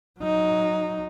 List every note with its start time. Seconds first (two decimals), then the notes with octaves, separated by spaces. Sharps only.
0.20 F#3 D#4